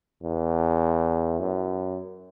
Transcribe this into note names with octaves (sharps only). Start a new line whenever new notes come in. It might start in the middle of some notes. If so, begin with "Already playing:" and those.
E2
F#2